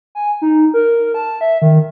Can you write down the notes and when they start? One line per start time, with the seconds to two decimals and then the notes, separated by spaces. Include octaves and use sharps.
0.15 G#5
0.42 D#4
0.74 A#4
1.14 A5
1.41 E5
1.62 D#3